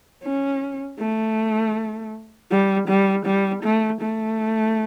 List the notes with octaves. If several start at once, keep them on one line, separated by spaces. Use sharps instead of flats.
C#4
A3
G3
G3
G3
A3
A3